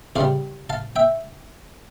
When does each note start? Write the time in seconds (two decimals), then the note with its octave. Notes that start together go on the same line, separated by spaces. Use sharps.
0.16 E2 C#3 G3 D5 F5
0.70 F5 A5
0.96 E5 G5